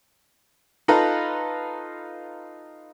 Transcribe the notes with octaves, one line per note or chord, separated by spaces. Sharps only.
D#4 F4 A4 B4 F5 A#5